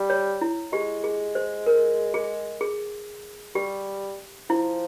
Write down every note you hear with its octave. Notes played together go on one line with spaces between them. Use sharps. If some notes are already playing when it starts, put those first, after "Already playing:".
Already playing: G3
C#5
E4
G#3 G4
G#4
C5
A#4
G#4
G#4
G3 G4
F3 E4